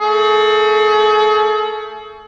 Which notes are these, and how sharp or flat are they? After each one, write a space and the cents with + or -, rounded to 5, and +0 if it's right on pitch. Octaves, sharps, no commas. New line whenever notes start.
A3 +30 G#4 +45